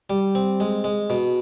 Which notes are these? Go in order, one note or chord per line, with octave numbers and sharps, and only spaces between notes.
G3
C4
G#3
G#3
B2